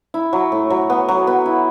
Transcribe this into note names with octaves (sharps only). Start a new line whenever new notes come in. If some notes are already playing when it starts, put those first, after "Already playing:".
E4
F#3
A2
F#3
B3
F#3
B3
E4